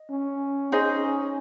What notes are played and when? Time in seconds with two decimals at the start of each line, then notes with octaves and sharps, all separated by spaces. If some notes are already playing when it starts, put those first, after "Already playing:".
Already playing: D#5
0.10 C#4
0.72 C#4 D#4 G#4 C5 D#5